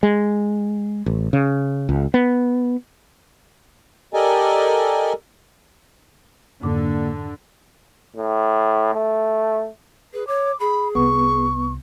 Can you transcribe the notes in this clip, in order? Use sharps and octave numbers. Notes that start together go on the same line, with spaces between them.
G#3
A1
C#3
C#2
B3
G4 A4 A#4 D5 D#5 G#5
F2 G#2 D3 A#3 D6
A2
A3
G#4 B4
C#5 D6
G#4 B5
C2 B3 C#6